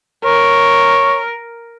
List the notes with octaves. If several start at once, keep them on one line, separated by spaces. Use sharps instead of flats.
A#4 C#5